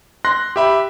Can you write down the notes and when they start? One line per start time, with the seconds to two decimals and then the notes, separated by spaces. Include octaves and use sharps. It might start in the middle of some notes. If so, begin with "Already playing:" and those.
0.25 C6 F#6 A#6
0.56 G4 E5 B5